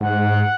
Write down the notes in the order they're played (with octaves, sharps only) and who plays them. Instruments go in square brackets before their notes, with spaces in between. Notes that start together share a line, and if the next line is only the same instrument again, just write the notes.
[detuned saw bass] G#2 [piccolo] F#5